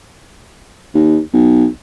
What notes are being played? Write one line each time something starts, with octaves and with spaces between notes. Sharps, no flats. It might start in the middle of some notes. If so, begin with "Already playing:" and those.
D#2
B1